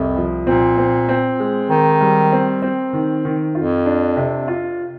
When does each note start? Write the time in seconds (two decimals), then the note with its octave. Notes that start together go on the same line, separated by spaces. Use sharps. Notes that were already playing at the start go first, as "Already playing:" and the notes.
Already playing: C2 F2
0.16 F3
0.47 A#2 C4
0.78 C4
1.09 C4
1.40 G#3
1.70 D#3 C4
2.01 G3
2.32 C4
2.62 C4
2.93 D#3
3.25 D#3
3.55 F2 F4
3.86 D4
4.16 C3
4.48 F4